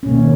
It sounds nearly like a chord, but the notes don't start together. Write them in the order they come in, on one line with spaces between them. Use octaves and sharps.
C#4 B2 A#3 D#3